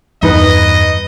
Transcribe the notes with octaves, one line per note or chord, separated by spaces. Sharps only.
E2 G2 D#4 B4 D#5